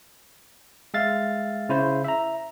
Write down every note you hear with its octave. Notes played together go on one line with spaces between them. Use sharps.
G#3 E5 F5 A6
C#3 E4 C5
E5 A#5